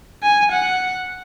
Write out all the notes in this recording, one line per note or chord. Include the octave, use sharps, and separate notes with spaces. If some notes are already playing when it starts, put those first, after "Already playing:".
G#5
F#5